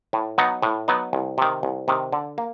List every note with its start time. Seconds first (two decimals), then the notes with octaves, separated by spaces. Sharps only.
0.13 A2
0.38 F#3 B3 D#4
0.63 A2
0.88 F#3 B3 D#4
1.13 C2
1.38 C3 D#3
1.63 C2
1.88 C3 D#3
2.13 D3
2.38 A#3